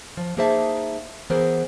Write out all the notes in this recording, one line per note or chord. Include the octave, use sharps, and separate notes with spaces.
F3
A#3 D#4 G#4 C5 E5 A5
E3 B3 G#4 A#4 C5